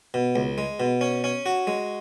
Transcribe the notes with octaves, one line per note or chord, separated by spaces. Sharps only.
B2
C#2
G#3
B2
C#4
C#4
F#4
G#3